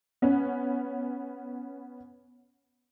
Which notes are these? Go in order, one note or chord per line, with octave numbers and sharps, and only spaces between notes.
B3 C#4